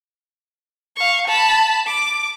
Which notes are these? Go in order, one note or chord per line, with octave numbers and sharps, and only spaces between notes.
F5 C#6
A5 B5
D6